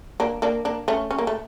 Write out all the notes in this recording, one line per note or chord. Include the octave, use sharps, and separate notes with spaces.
A#3 D4
A#3 D4
A#3 D4
A3 C#4
C#4
A#3
A3